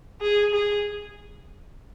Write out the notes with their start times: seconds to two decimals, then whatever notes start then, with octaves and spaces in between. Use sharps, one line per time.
0.21 G#4
0.53 G#4